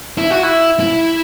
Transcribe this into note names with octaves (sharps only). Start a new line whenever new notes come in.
E4
F#4
E4
E4